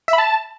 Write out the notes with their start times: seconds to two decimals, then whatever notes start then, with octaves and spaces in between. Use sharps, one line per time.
0.08 E5
0.13 B5
0.18 A5